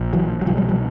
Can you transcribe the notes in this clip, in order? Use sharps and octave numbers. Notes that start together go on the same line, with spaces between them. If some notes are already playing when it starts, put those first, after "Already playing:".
Already playing: A#1
E3 F#3
F#3
C2 B2 F3 G3
F#3 G#3
F3 G3